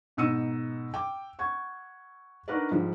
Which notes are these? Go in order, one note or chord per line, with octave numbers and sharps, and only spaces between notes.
G#2 B2 D#4 E6 C#7 D#7
G5 D6
F#5 C#6 G#6
D4 D#4 F#4 A#4 B4 D5
G#2 F3 G3